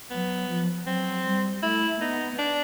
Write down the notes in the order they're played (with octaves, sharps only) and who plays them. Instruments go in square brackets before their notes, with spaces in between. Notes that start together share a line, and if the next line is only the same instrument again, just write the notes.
[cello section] F#3 [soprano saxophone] B3
[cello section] F3
[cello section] F#3 [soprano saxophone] C4
[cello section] G3
[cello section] A3 [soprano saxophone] E4
[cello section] B3 [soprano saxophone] D#4
[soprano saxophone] D4